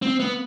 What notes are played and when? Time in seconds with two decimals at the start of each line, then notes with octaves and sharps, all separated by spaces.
0.02 C4
0.20 B3